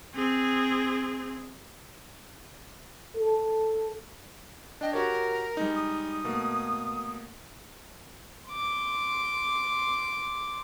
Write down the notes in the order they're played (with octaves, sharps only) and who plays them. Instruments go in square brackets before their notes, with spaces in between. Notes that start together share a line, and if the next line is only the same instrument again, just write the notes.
[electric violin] C4 G#4
[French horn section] A4
[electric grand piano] D4 G5 [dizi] D#5
[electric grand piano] F#4 G4 C#5 [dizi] A#4
[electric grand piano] G3 G#3 D#4
[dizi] D#6
[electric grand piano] B2 A3 A#3
[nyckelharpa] C6 D6